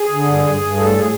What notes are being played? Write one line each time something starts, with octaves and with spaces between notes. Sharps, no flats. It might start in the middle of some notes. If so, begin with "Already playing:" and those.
Already playing: G#4
D3
G2
G2
G2
A2 A4
A2 G#4